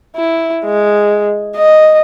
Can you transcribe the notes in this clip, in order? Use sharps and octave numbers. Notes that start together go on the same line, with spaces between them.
E4
G#3
D#5